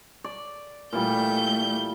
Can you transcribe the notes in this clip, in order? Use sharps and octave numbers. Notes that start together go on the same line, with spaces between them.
D5
A#2 E3 G3 A3 G6